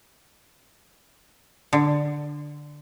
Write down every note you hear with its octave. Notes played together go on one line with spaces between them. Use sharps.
D3